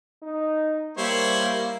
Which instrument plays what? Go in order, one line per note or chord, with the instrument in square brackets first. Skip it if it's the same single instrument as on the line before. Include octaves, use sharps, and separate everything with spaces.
[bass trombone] D#4
[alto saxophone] G3 [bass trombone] A#3 [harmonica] E4 C5 C#5